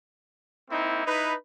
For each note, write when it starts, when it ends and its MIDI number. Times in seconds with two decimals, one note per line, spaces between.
0.70 1.02 58
0.70 1.02 60
0.70 1.02 63
0.70 1.02 64
1.05 1.34 63
1.05 1.34 64
1.05 1.34 71